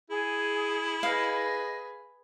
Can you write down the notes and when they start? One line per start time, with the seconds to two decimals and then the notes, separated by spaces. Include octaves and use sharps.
0.10 E4 G#4
1.03 G#4 B4 D#5 F5